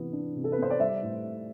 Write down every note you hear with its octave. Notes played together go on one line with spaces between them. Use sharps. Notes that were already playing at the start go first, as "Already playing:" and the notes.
Already playing: C3 E3 B3
D4
C3
A4
B4
B3 C5
D5
G3 E5
A2